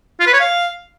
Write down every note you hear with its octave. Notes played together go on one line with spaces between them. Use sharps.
F4
B4
C#5
F5